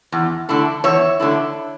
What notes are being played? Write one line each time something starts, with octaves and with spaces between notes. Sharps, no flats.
E2
D3 A3 E4
E2 C#5 E5
D3 A3 E4